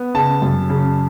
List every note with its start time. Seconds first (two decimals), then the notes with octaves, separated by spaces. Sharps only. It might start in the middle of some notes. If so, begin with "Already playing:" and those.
Already playing: B3
0.14 C#3 A5
0.42 F#2
0.70 C#3